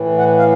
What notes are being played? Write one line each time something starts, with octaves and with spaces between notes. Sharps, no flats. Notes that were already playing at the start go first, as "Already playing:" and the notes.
Already playing: A2 E3
F#5
F5